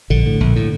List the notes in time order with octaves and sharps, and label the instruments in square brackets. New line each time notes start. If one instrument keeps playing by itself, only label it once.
[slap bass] A#1 D3
A2
A#1
A2